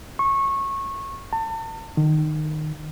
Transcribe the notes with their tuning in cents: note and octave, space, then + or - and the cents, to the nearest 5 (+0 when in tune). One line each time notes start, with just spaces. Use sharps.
C#6 -20
A5 +35
D#3 -20